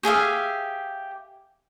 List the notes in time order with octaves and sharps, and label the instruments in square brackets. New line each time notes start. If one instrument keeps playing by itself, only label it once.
[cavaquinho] G4 G#4 E5 F5